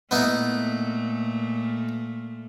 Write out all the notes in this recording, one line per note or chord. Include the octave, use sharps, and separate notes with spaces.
A#2 A3 B3 D#4 E4